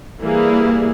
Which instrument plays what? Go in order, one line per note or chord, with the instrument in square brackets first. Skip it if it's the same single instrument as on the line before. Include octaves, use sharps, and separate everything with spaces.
[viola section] E3 G3 A#3 E4 G#4